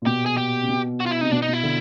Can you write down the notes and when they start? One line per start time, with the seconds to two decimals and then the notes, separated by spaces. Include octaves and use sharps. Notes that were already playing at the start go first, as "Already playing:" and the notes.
0.02 A#2
0.06 B2 G4
0.26 G#4
0.37 G4
0.63 C3
0.68 B2
1.00 F#4
1.06 F4
1.11 E4
1.21 C3 D#4
1.31 B2 D4
1.42 D#4
1.48 B2
1.53 E4
1.63 D3